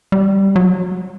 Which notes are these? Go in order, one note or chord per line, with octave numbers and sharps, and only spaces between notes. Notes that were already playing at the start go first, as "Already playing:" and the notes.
G3
F#3